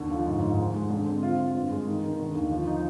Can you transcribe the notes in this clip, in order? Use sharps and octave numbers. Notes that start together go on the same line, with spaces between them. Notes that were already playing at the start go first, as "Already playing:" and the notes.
Already playing: D#2 D3
F3
G#2
G#2
G#3
G#3
D3
C4
F4
F4
G2
G#3
D#3
D#3
D3
D#2
F3
D#4